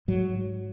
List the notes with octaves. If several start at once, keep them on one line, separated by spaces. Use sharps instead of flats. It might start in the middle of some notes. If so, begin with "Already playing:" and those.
G#2 F#3